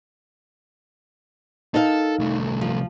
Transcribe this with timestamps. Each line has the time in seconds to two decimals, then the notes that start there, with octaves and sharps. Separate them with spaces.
1.74 D#4 A4 A#4 F5
2.19 C2 A3
2.61 F3